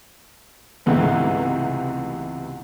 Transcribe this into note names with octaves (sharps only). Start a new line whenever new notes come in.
C#2 G#2 C3 E3 A3 B3